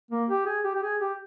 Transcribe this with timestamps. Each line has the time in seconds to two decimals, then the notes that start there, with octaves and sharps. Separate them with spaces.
0.11 A#3
0.29 G4
0.46 G#4
0.64 G4
0.74 G4
0.82 G#4
1.00 G4